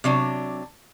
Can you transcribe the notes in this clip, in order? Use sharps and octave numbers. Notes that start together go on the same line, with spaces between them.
C3 F#3 D4